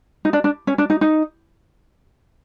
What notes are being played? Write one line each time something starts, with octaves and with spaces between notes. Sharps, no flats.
D#4
D4
D4
C#4
D4
D#4
D#4